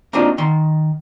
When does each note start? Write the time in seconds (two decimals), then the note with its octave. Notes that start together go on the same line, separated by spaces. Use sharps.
0.13 A#3 C4 D4 D#4 F4
0.38 D#3 C6